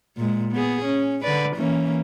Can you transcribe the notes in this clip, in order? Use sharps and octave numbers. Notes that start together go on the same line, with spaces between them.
A#2 G#3
B3 G#4
C#4
D3 B4 D5
E3 A#3 C#4